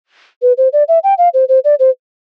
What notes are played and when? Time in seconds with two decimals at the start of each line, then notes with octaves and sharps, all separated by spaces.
0.42 B4
0.58 C5
0.73 D5
0.88 E5
1.04 G5
1.18 F5
1.34 C5
1.49 C5
1.64 D5
1.79 C5